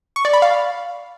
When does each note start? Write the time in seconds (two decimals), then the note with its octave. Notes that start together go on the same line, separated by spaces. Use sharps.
0.16 C#6
0.25 D5
0.33 B5
0.42 F5